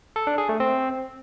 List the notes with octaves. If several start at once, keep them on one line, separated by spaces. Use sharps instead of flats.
A4
D4
G#4
A3
C4